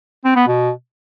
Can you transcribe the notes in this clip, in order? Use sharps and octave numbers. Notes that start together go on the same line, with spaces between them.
C4
B3
B2